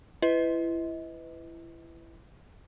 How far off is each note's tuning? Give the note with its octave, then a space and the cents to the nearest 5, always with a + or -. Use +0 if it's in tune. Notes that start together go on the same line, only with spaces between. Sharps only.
E4 +25 B4 +20 D#5 +35